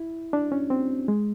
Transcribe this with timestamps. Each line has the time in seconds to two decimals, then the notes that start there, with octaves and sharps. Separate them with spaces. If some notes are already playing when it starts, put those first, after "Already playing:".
Already playing: E4
0.33 D4
0.52 C#4
0.70 C4
1.08 G#3